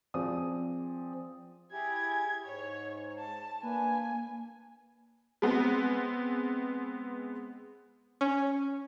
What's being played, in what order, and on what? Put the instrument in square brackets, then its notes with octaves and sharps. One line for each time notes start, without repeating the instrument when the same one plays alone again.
[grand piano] F3 C4 G#4 D5 D#6
[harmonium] E4 G4 G#4 [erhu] G#6
[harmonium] G#2 [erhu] C#5
[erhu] A5
[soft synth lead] A#3 [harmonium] D4 B4 [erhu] G#5
[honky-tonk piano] G#3 B3 C4
[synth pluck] C#4